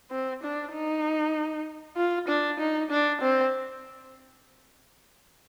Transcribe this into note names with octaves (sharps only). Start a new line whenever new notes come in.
C4
D4
D#4
F4
D4
D#4
D4
C4